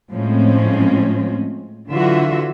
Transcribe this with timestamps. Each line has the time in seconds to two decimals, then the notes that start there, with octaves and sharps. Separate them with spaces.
0.11 A2 F3 G#3 C4 C#4
1.89 D3 E3 F#3 F4 F#4 E5